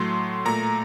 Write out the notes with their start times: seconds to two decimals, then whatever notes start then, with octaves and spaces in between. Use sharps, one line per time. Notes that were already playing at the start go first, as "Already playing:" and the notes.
Already playing: A2 F#3 A3 C6
0.45 A#2 A3 A#5